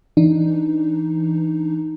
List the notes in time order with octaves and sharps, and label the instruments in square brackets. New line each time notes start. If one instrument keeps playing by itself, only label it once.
[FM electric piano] E3 D4 D#4